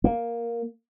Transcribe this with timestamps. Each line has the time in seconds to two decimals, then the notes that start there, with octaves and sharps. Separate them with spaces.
0.04 A#3